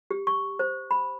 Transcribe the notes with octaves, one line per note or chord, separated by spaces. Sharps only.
G4
C#6
C5
B5